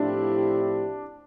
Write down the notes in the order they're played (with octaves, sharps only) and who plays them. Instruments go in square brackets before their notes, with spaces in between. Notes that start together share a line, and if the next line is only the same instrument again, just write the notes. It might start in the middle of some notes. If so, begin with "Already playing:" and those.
Already playing: [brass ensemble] A2 F3 C4 E4 G4 [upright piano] D4